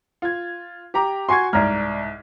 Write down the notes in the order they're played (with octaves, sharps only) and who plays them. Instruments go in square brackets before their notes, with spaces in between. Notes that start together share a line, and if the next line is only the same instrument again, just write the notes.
[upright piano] F4 G#6
G4 A#5 D6
[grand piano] F#4 G#5 C7 [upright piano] C6 C#6 G#6
[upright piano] C2 G#2 [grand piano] D5 A#5 F6